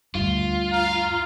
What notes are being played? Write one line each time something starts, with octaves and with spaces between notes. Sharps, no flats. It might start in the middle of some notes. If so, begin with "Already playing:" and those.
D2 G2 F4
F5 A#5